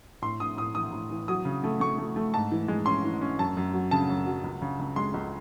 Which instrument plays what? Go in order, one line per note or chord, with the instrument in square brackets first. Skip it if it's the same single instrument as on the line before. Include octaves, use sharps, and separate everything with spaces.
[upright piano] A2 C6
A2 D#6
A2 D#6
E3 D#6
A2
E3
F#3 D#6
C#3
A3
A3 C#6
A3
A3
G#2 A5
E3
G#3
C#4 C6
E3
C#4
F#2 A5
F#2
F#3
C#3 A5
F#2
F#3
C#2
C#3
C#2
G#3 C6
C#2